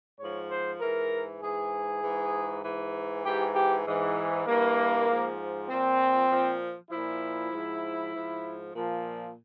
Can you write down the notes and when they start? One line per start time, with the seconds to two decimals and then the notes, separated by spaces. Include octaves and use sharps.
0.19 G#2 F3 C#5
0.51 C5
0.80 G#2 E3 A#4
1.42 G#2 E3 G#4
2.03 G#2 E3
2.64 G#2 E3
3.24 G#2 E3 G4
3.55 G4
3.85 G#2 E3
4.47 G2 E3 A#3
5.08 G#2 F3
5.69 A#2 F3 C4
6.29 A#2 F3
6.91 A#2 F3 E4
7.52 G#2 F3
8.13 G#2 F3
8.74 A#2 F3